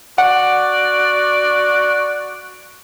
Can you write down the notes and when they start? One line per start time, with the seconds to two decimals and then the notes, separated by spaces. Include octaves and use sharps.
0.18 F#4 D5 F#5